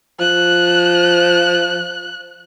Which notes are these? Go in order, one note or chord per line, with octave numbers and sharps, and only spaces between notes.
F3 F#6